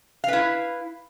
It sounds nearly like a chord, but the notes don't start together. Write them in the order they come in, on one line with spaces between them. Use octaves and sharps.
F5 B4 E4